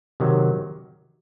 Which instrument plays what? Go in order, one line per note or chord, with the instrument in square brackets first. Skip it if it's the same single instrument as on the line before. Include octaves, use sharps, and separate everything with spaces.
[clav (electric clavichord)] C3 D#3 F#3